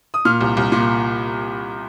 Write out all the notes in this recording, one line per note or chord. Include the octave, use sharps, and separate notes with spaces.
D#6
A#2 F6
C2
C2
A#2